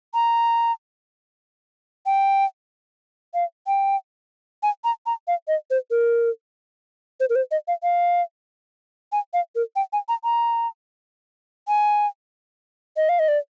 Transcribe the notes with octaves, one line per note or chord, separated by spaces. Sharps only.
A#5
G5
F5
G5
G#5
A#5
A#5
F5
D#5
C5
A#4
C5
A#4
C5
D#5
F5
F5
G#5
F5
A#4
G5
G#5
A#5
A#5
G#5
D#5
F5
D#5
D5